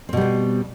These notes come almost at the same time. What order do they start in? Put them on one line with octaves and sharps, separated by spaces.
C4 B2 G3 B3